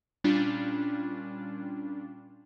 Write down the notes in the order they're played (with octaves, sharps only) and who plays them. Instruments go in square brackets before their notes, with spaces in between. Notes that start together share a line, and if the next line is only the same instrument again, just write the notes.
[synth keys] A#2 G3 C#4 D4 F4